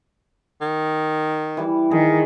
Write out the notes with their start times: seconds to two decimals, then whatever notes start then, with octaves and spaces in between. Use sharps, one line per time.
0.62 D#3
1.57 E3 G3
1.91 D#3 G#4